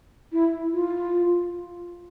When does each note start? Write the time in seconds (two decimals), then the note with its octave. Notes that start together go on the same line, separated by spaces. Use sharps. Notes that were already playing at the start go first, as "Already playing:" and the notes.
0.32 E4
0.73 F4